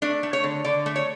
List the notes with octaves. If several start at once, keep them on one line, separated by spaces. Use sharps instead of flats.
A3 D4
A3
C#5
D3
D3 D5
A3
C#5